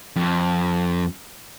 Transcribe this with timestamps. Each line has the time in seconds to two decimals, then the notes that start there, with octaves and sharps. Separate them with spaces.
0.16 F2